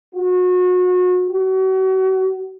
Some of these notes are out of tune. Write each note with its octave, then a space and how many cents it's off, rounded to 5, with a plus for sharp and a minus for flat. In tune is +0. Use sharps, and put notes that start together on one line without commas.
F#4 -30
F#4 +35